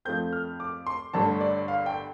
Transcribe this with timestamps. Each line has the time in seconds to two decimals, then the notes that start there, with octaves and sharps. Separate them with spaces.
0.05 F2 F3 A3 C4 G6
0.33 F6
0.60 D6
0.87 C6
1.13 G1 G2 D3 A3 A5
1.41 D5
1.68 F5
1.86 G5